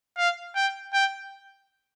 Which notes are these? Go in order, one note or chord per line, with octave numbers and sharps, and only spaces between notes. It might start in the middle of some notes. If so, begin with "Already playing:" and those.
F5
G5
G5